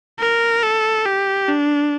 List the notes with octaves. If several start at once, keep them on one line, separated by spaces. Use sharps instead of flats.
A#4
A4
G4
D4